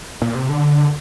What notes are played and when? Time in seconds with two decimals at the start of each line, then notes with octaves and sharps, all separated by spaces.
0.22 A#2
0.35 C3
0.49 D3